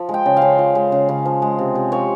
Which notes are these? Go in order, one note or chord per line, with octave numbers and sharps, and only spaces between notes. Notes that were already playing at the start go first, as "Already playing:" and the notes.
Already playing: F3
G#3
G5
C#3
F5
C#3
F3
G#3
C#3
C#3
F3
G#3
C3
C3
F3 C#5